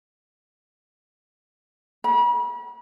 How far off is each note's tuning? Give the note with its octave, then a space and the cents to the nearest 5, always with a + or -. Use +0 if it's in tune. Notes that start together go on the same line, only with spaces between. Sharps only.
B5 -40